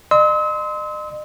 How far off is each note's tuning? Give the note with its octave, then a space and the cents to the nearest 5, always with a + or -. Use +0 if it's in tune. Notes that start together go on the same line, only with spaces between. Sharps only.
D#5 -40 C6 -15 E6 -45